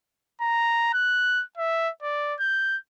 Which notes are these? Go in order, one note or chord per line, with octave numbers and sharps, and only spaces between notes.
A#5
F#6
E5
D5
G6